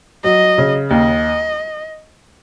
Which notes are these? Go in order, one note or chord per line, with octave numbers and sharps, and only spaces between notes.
F#3 D#5
C#3
D#2 D#5